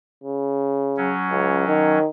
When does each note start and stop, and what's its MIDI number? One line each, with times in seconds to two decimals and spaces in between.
0.24 1.14 49
0.97 1.99 54
0.97 1.99 61
1.31 1.65 37
1.68 2.08 51